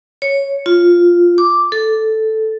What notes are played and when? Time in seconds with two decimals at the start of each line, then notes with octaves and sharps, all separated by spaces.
0.22 C#5
0.66 F4
1.38 D6
1.72 A4